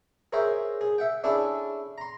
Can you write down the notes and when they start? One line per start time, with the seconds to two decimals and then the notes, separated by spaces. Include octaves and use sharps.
0.33 G#4 A#4 C5 C#5 E5 G5
0.81 G#4
0.98 E5 F#5 G5
1.24 C#4 D4 E4 G#4 A4
1.98 A#5 C6